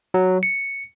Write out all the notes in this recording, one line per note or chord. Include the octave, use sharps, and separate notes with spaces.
F#3
C#7